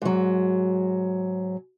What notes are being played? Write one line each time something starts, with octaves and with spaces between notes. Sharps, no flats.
G#2 F#3